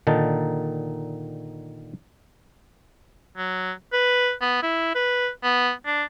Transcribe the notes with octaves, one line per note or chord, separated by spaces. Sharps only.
A#2 D3 D#3 D#4 A5
F#3
B4
B3
E4
B4
B3
D4